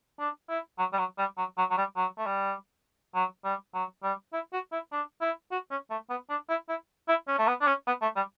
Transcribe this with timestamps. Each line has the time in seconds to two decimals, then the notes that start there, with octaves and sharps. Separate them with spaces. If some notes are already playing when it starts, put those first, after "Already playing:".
0.19 D4
0.49 E4
0.78 F#3
0.93 G3
0.99 F#3
1.18 G3
1.38 F#3
1.58 F#3
1.71 F#3
1.77 G3
1.96 F#3
2.18 A3
2.26 G3
3.15 F#3
3.45 G3
3.74 F#3
4.03 G3
4.33 E4
4.53 F#4
4.72 E4
4.92 D4
5.21 E4
5.51 F#4
5.71 C#4
5.90 A3
6.10 B3
6.30 D4
6.49 E4
6.69 E4
7.08 E4
7.28 C#4
7.39 A3
7.47 B3
7.61 D4
7.67 C#4
7.87 B3
8.02 A3
8.16 G3